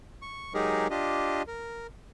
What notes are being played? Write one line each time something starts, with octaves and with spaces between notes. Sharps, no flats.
C#6
F#3 G#3 D#4 G4 G#4 A#4
D4 F4 G4 D#5
A#4